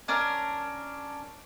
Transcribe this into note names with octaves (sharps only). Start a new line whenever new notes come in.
C#4 D4 A#4